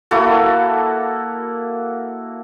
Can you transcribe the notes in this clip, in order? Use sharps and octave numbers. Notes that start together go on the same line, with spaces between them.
A#3 E4 F#4 A4